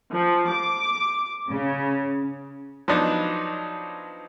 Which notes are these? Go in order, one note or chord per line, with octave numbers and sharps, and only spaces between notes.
F3
D6
C#3
F3 F#3 B3 D4 D#4